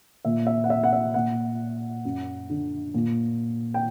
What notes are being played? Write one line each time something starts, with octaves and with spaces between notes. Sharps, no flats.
A#2 E5
E5
F#5
E5
F#5
E5
A#2 F#5
F#2
D3
A#2
G5